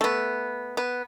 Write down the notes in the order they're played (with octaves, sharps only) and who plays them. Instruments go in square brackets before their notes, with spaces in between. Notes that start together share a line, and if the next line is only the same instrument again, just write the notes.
[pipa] A3 B3
B3